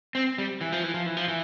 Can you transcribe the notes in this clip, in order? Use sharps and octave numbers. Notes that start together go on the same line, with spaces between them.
C4
G3
E3
F3
E3
F3
E3
F3
E3